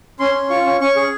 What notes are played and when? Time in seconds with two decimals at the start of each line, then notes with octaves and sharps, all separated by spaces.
0.19 C#4 C6
0.35 C#4
0.50 F4 C#6
0.66 C#4
0.81 C#4 C#6
0.96 G#4